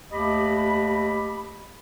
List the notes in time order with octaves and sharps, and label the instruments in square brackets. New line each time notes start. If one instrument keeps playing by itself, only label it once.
[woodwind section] D#2 A3 G4 D#5 B5